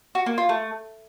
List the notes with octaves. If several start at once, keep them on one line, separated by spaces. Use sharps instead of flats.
F#4
A#3
F4
A3